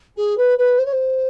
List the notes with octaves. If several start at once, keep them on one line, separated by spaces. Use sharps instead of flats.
G#4
B4
B4
C5
C#5
C5